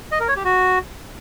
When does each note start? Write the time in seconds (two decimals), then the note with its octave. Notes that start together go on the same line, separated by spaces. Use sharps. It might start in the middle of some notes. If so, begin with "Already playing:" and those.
0.12 D#5
0.20 A#4
0.28 C#5
0.36 G4
0.45 F#4